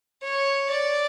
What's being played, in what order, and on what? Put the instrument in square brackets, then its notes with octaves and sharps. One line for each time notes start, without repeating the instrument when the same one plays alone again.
[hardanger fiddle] C#5
D5